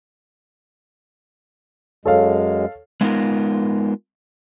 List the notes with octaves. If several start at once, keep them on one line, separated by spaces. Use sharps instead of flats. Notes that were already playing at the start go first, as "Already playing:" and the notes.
F#2 G#3 A4 C#5 F5
G#3 A3 B3 D#4 F4 A#4